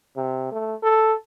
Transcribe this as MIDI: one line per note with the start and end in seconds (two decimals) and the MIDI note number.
0.16 0.50 48
0.52 0.75 57
0.83 1.14 69